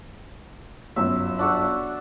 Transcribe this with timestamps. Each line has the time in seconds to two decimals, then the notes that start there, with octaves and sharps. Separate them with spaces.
0.96 G1 F#2 E5
1.39 D4 F#4 A4